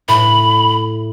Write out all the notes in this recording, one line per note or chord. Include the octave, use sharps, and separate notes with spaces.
A2 B5